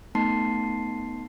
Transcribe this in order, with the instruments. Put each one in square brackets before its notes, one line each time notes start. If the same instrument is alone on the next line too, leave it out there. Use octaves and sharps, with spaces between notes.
[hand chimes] A3 B3 D#4 A5 C6 C7